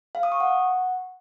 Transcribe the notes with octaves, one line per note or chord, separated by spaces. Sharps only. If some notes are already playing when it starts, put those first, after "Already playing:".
F5
D#6
C#6
F#5